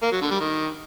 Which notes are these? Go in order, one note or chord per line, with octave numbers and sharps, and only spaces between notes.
A#3
F#3
D3
G3
D#3